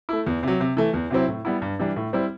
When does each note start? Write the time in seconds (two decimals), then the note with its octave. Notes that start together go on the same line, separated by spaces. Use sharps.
0.09 A3 E4
0.26 E2
0.43 C3 F#3
0.60 C3
0.77 E3 A3
0.94 E2
1.10 C3 F#3 C4 E4
1.28 A2
1.45 G3 B3 E4
1.62 G2
1.79 E3 G3 D4
1.96 A2
2.13 G3 C4 E4